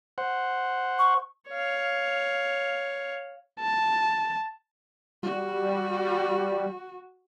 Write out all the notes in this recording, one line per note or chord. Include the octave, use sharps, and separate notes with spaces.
C5 F#5
C#6
C#5 F5
A5
G3 F#4